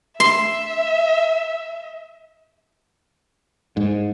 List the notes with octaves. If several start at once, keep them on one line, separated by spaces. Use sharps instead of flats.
E5 C6
G#2